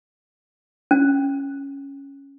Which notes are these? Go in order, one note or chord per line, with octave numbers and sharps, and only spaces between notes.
C#4